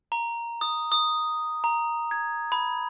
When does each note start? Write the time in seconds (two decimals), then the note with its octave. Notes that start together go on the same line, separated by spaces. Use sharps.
0.12 A#5
0.61 D#6
0.92 D#6
1.64 A#5
2.11 G#6
2.52 B5